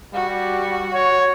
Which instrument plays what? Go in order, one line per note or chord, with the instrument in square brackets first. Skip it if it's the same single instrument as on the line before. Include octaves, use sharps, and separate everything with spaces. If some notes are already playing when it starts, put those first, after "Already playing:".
[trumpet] G3 [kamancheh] F#4
[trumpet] C#5